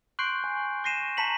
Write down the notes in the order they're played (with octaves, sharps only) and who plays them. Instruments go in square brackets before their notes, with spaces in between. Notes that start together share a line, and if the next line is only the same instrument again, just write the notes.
[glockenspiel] C6 C#6 F#6 G6 C7 D7
G#5
C#6 A#6 C7 D#7 E7
A5 A#5 B6 C#7 F#7